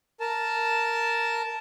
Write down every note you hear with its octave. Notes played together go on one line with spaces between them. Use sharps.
A#4 A5